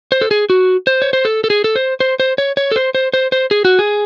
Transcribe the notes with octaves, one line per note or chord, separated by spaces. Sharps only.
C5
A4
G#4
F#4
C5
C#5
C5
A4
A4
G#4
A4
C5
C5
C5
C#5
C#5
A4
C5
C5
C5
C5
G#4
F#4
G#4